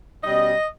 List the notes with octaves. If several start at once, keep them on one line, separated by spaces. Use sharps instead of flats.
B2 G3 C#4 D#5